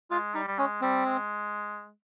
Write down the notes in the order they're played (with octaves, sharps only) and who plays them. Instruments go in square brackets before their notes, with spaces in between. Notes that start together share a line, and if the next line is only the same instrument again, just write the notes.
[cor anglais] G#3 [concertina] F4
[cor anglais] G3 [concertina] D#4
[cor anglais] G3
[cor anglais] G#3 [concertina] C#4
[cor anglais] G3 [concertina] C4
[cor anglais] G#3